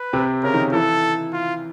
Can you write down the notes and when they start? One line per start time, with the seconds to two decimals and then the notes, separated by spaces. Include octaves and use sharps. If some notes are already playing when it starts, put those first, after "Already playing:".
Already playing: B4
0.13 C3 C4
0.43 C#3 C#4 A#4
0.54 D#3 D#4
0.73 E3 E4 A4
1.33 F4